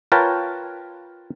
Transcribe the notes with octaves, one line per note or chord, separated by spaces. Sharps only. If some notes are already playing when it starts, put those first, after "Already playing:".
F4 A#4 B4 C#5 G5 A5